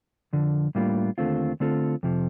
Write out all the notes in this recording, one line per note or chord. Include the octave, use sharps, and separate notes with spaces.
F2 D3 F3
A2 G3 A#3 D4 F4
D#2 D3 A3 C4 F4
D3 A3 C4 F4 A4
F2 C3 F3